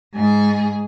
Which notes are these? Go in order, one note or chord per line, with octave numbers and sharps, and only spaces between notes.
G#2 G#4